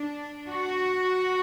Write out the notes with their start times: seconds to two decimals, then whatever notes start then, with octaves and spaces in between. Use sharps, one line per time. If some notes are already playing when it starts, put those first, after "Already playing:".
Already playing: D4
0.49 F#4